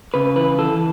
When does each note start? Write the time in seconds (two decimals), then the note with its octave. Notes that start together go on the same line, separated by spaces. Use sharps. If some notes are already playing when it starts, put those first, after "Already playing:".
0.14 C#3 B4
0.36 E3 B4
0.58 E3 A4